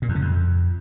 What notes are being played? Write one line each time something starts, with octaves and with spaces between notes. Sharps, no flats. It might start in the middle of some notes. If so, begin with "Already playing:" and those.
A#2
E2
C#3
F2